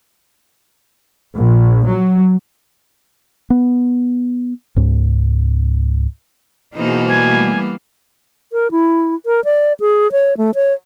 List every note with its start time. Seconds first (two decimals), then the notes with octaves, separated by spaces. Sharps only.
1.33 A#1
1.86 F#3
3.50 B3
4.76 C#2 G#2
6.75 B2 E3 A#3 B3 D#4 G#4 C5
7.07 G3 A3 G#5
8.52 A#4
8.71 E4
9.26 A#4
9.44 D5
9.80 G#4
10.12 C#5
10.37 A3
10.55 C#5